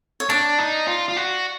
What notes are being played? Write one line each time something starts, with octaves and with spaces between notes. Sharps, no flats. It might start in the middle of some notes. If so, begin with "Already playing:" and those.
C#5
D4 D5
D#4
F4
F4
F#4